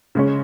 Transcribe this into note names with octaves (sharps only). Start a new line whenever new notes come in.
C#3 G#3 C#4